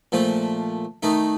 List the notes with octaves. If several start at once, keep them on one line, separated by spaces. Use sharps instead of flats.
A#2 F3 A3
D#3 A3 D#4